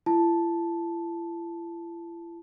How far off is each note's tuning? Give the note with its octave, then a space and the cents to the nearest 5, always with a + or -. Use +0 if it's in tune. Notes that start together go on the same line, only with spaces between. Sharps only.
E4 +45 A5 -5